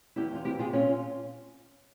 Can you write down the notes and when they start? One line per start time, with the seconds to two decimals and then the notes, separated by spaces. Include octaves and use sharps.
0.16 E2 E4 G4
0.31 E2 F4
0.45 C3 E4 G4
0.59 C3 F4 G#4
0.73 A#2 C#4 F4